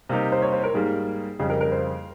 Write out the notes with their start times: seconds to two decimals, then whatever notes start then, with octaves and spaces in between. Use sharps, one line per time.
0.09 C3 G3 A#3 D#4 G4
0.32 C5
0.42 C#5
0.53 C5
0.64 A#4
0.74 G#2 G3 A#3 G#4
1.39 F2 C#3 G3 G#4
1.50 A#4
1.61 A#4
1.72 C5